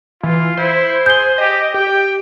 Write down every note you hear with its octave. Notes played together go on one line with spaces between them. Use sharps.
E3 F4
E4 C5
G#4 G6 G7
G4 D#5
G4 G5